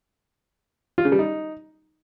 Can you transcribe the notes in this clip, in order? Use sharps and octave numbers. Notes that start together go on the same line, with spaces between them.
F4
C#3
G3
D#4